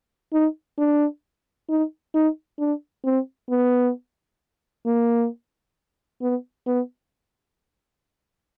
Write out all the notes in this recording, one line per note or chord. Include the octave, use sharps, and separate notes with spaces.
D#4
D4
D#4
D#4
D4
C4
B3
A#3
B3
B3